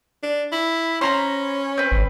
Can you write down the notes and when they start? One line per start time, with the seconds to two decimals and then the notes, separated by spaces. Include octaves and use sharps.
0.23 D4
0.52 E4
1.01 C#4 C5 A#5 B5
1.77 C4 B4
1.92 G#1